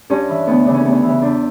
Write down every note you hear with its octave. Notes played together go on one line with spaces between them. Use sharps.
G2 C#4
E3
D2 B3
C#3 E3 D4
C#4
D2 B3
C#4
C#3 E3
E2 D4